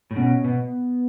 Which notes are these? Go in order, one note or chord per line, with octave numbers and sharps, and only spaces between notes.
A2
B2 C#4
B2 B3